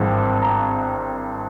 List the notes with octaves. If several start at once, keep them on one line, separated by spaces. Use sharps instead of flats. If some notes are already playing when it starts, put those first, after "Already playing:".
Already playing: G#1 G2 E3 G#3 C4
A#5